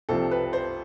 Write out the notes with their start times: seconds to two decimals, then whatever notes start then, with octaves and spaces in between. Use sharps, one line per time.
0.09 C2 C3 F3 A4
0.31 B4
0.53 C5